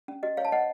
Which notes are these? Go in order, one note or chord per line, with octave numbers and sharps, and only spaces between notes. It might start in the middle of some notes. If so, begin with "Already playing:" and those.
C#4
F#4 D#5
C5 C#5 F5
A5
C5 D#5 F#5